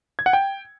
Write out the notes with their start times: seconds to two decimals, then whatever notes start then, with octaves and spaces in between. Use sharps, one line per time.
0.19 G#6
0.26 F#5
0.33 G5